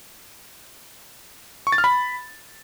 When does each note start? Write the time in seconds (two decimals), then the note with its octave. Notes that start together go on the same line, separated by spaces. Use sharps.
1.67 C#6
1.72 A6
1.78 F6
1.84 B5